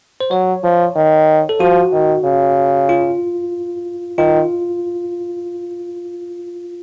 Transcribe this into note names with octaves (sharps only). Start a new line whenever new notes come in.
C5
F#3 C#5
F3
D#3
A4
F3 F#4
D#3
C#3
F4
D#3 F4